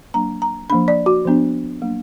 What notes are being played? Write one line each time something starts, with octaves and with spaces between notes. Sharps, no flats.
F#3 A#3 D4 A#5
A#5
F3 A#3 D4 B5
D5
F#4
F3 B3 D4
F#3 A#3 D4